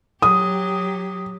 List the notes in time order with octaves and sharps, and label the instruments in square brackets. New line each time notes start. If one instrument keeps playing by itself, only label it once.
[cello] F#3 G4 [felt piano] D#6